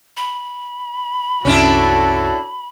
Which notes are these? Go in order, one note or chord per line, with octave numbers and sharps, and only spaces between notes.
B5
C2 F#2 C#4 D4 E4 F#4 A4